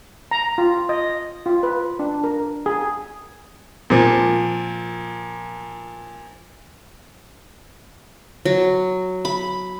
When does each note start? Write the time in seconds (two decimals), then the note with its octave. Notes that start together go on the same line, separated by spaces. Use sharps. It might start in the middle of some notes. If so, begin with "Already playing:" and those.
0.31 A#5
0.58 F4
0.89 D#5
1.46 F4
1.63 B4
1.99 D4
2.24 A#4
2.66 G#4
3.90 A#2 F3
8.45 F#3
9.25 B5